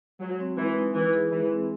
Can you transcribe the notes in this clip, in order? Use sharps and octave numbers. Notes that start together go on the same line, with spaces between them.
F#3 G#3
C4
E3 G#3
D#4
E3 E4
G#4
E3 G#3
C4